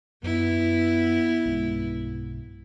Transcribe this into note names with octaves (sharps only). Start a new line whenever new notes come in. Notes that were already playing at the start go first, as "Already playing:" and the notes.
F#2 B3 E4
B1 G2 G#3